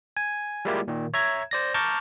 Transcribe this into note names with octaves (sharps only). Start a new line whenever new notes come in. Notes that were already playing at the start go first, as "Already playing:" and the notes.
G#5
G3 G#3 A#3 E4 F4 G4
A#2 D#3
C#5 E5 A#5 G#6
C5 D5 A#6
A5 A#5 C#6 D6 F6 G6